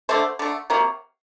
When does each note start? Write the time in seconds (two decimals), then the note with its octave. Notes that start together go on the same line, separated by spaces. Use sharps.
0.09 D3 A3 C5
0.39 D3 A3
0.70 C3 F#3 A#3